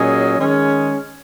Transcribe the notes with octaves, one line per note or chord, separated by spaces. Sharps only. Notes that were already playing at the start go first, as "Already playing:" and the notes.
Already playing: A#2 F#3 C#4 G#4 D#5
D#3 G#3 C#4 G#4